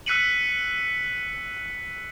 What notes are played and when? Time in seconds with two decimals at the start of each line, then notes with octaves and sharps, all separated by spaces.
0.06 E6 F#6 B6 C#7 D#7 F#7